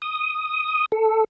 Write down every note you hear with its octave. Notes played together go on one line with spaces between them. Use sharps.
D#6
A4